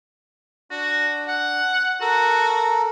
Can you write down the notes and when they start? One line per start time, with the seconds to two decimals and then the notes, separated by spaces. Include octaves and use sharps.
0.71 D4 F#4
1.28 F#5
2.01 F#4 A4 A#4